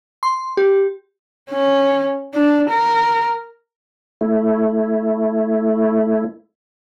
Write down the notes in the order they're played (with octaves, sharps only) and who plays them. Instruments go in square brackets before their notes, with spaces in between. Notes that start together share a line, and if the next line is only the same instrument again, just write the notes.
[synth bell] C6
G4
[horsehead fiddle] C#4
D4
A#4
[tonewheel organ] A3 E4